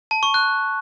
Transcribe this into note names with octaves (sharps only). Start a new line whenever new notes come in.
A5
C#6
F#6